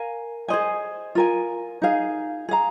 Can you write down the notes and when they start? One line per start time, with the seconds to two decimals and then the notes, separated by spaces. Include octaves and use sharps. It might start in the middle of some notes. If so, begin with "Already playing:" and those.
Already playing: A#4 F5 G#5
0.48 G#4 C5 D#5 G#5
1.15 F4 A#4 G#5
1.82 D#4 G#4 F5
2.49 G#4 F5 A#5